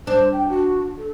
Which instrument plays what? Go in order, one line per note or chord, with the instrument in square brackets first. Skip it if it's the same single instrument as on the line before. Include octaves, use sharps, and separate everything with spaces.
[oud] D4 [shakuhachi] C5
[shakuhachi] G5
F#4
A4